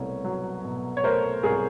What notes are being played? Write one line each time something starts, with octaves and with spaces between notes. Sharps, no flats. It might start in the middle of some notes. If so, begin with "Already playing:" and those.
Already playing: C2 B2 A3 C#5
F#3
B2
C#5
A3 A#4 C5
C2 G#4 A#4